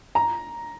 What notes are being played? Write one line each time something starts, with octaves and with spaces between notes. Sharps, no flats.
A#5